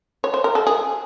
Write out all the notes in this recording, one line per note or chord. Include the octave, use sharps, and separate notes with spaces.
C#5
C5
A#4
A4
G#4